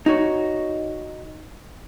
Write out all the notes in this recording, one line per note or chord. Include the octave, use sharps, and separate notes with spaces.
D#4 F#4 C#5